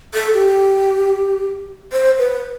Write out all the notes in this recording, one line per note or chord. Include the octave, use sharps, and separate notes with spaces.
A4
G4
C5
B4